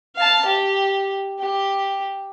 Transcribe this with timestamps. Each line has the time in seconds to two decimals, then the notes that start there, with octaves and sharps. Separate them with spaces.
0.16 F5 A5
0.45 G4
1.39 G4